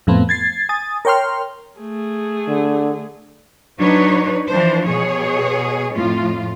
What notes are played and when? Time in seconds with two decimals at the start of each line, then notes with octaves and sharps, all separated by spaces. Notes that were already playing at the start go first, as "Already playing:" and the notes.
0.07 F2 A2 F3 A3 B3 C4
0.29 G#6 A6 C7
0.69 G#5 D#6 A6
1.05 A#4 C#5 G5 C6 F6
1.80 A3 G#4
2.48 D3
3.78 F#3 D4 D#4 B4 C#5
4.48 E3 F3 D4 C5
4.86 B2 G#4 C#5
5.95 F2 A2 F4